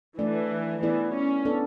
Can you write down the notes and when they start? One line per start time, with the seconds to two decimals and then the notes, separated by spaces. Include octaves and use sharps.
0.19 E3 A3 D4 A4 D5
0.82 E3 B3 E4 G#4 D5
1.13 C#4
1.45 B3 D4 A4 D5